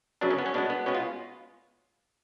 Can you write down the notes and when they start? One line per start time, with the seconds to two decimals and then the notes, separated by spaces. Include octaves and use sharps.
0.21 F#2 C#3 F#3 B3 D4
0.31 C#4
0.38 B3
0.46 C#4
0.54 B2 G#3 B3 D4
0.70 B3
0.86 B2 G#3 B3 C#4
0.95 F4